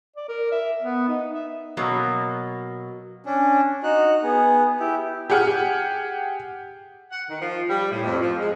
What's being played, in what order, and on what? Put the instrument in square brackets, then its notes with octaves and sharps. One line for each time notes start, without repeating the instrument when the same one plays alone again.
[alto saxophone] D5
A#4
E5
B3
D#4
E5
[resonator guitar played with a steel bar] B2 F#3 A#3
[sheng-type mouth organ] C#4 D4
D#4 F#4 F#6
B3 G#4
E4 G4
[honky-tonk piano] G4 G#4 F#5 G#5 F6 G6
[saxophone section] F#5
D#3
F3
G3
A2
F2
F3
G#3